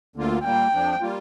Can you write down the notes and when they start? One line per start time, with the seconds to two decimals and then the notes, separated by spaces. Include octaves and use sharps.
0.16 D2 D3 A#3 F4
0.44 A#2 G3 A#3 G5
0.73 F2 F3 D4
1.01 G3 A#3 F4